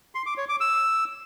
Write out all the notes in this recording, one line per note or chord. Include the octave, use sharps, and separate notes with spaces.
C6
D6
C#5
D6
E6